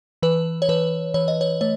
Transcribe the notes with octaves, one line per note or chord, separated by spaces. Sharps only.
E3 B4
C#5
E3 B4
E3 C#5
D#5
C#5
A3 C#5